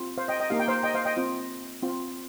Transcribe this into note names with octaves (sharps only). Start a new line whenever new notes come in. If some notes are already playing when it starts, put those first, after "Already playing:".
Already playing: C4 F4
C5 F5
D#5 G5
D#5 G5
A#3 D#4 G4 F5
G5
C5 F5
D#5 G5
C5 F5
D#5 G5
C4 F4
C4 F4